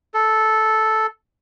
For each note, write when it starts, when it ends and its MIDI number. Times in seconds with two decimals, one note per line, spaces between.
0.14 1.06 69